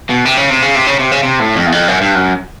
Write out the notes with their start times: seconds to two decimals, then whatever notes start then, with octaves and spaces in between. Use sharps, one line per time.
0.10 B2
0.25 C3
0.37 C#3
0.50 C3
0.62 C#3
0.75 C3
0.87 C#3
0.99 C3
1.11 C#3
1.23 C3
1.40 A2
1.56 F2
1.66 E2
1.72 F2
1.88 F#2
2.01 G2
2.15 F#2